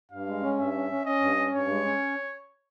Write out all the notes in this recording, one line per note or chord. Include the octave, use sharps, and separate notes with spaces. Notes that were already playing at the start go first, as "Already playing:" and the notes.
G2 F5
G#3
C#4
G2 E5
C#4
C#4
C#4 D#5
G2
C#4
G2 C#5
G#3
C#4